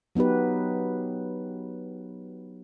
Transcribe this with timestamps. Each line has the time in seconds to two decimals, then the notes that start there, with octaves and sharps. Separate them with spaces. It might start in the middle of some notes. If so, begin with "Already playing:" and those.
0.15 F#3 B3 D#4 G4 B4